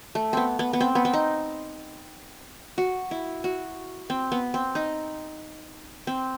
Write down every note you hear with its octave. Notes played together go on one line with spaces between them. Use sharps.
A3
B3 C4
B3
B3
C4
B3
C4
D#4
F#4
E4
F#4
C4
B3
C4
D#4
C4